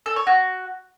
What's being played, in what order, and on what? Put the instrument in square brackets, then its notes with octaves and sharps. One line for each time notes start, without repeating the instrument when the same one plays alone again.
[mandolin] A4
C#5
F#4